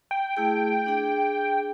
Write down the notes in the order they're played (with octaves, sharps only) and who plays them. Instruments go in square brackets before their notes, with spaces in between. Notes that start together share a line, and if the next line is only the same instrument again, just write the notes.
[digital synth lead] G5
[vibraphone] A3 E4 G#4
D4 G#4